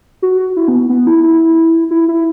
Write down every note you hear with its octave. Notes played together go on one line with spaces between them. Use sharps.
F#4
E4
B3
B3
E4
E4
E4
E4